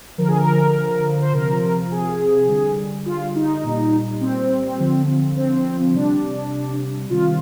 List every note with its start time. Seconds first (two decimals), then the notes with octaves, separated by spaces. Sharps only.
0.18 D3 F3 A#4
0.28 G#4
0.37 A#4
1.21 C5
1.33 C3 F3 A#4
1.91 G#4
2.48 D3 G3
3.06 F4
3.35 D#4
3.64 A#2 G3
4.21 C4
4.80 D3 F3
5.36 C4
5.94 C3 G3 D4
7.10 C3 D#3 G3 F4